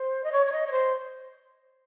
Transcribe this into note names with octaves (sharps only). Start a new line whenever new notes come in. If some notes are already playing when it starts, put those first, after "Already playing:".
Already playing: C5
D#5
C#5
C#5
D#5
C#5
C5